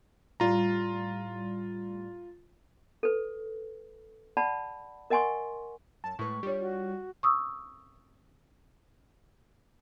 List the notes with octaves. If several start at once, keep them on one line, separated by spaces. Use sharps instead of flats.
A2 G3 F4 A#5
A4 B4
D5 F#5 A5 B5
A#4 D#5 F#5 G#5 C6 C#6
F#2 A5
A2 G#3 B4 C#6
G3 D4 F4 C#5
F#4
C#6 D#6 E6